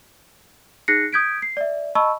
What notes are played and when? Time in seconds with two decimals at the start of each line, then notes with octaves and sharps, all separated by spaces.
0.88 D#4 G#4 F#6 A#6 C7 C#7
1.13 D#6 G6 G#6 B6 D7
1.42 C7
1.57 D5 E5
1.95 D#5 A5 B5 C#6 E6